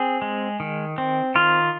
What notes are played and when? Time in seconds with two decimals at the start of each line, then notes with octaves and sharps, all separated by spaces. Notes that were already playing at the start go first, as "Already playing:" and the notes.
Already playing: C4 G#4
0.22 G#3
0.60 D#3
0.98 C4
1.35 D#3 F4